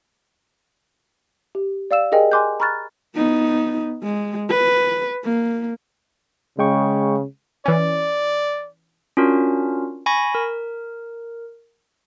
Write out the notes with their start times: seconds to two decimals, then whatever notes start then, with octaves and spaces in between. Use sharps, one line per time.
1.55 G4
1.91 D5 F5 E6 E7
2.12 G4 G#4 A#4 D#5 G5 G#5
2.32 G#5 C6 D6 F#6 G6
2.60 A#5 B5 C#6 F6 F#6 A6
3.15 B3 D#4
4.03 G#3
4.49 B4
5.24 A#3
6.59 C#3 G#3 G5 C#6
7.66 E3 C#4 D5
9.17 C#4 D4 F4 F#4 A#4
10.06 G#5 B5 C#6 A#6
10.35 A#4